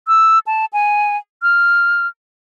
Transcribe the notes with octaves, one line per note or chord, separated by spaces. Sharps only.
E6
A5
G#5
F6